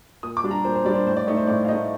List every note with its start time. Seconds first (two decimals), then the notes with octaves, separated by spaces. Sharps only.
0.23 A#2 D#6
0.37 D6
0.44 G3 D4
0.51 A#5
0.64 A#2 C5
0.75 C5
0.85 G3 D5
0.89 D4
0.95 C5
1.06 A2 C5
1.17 D5
1.27 A3 D#4 D5
1.37 C5
1.47 A2 D5
1.65 F5
1.68 A3 D#4 D#5